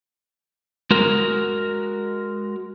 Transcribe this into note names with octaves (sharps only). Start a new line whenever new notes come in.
G#3 F#4 A#4